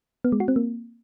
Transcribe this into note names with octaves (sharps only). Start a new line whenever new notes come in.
B3
G#3
F#4
C4
A#3